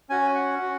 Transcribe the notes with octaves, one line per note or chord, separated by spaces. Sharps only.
C#4 F#4 G#5
F#5
C#4 F#4